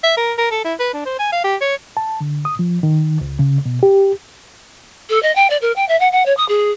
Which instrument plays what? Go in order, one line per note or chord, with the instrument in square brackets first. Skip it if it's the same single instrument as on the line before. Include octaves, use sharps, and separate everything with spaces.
[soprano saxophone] E5
A#4
A#4
A4
E4
B4
D4
C5
G#5
F5
G4
C#5
[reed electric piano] A5
D3
D#6
F3
D#3
C#2
C#3
B2
G4
[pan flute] A4
D#5
G5
D5
A#4
G5
E5
F#5
F#5
C#5
D#6
G#4